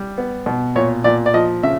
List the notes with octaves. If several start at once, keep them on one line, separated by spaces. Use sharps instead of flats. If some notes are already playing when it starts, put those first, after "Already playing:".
Already playing: G3
B3
B2
A#2 C#5
A#2 D5
D5
F3 D#5
C#3 E5